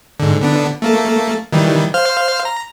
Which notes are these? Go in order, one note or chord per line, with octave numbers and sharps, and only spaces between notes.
G#2 D3
D3 B3 D4
A3 A#3 A4
D#3 E3 G3
C5 F5 F6
A#5